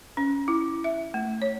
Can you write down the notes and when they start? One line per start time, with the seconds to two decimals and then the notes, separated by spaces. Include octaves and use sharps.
0.17 C#4
0.48 E4
0.84 E5
1.14 A3
1.42 C#5